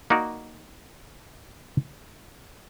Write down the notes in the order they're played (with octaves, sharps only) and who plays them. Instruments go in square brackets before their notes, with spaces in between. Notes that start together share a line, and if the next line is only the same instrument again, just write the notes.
[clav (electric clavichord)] A#3 D#4 F#4 D5